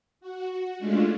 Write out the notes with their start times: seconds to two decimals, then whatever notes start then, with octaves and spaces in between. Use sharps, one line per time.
0.21 F#4
0.78 G#3 A3 C#4 D4 F4